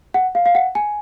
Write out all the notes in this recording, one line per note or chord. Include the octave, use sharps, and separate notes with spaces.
F#5
F5
F5
F#5
G#5